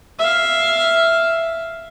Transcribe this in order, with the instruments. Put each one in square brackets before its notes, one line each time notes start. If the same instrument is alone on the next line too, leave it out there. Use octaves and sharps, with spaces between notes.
[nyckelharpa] E5 F5